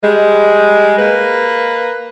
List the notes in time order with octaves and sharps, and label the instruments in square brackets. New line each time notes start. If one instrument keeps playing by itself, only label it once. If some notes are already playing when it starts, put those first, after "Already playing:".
[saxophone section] G3 G#3
A#3 B4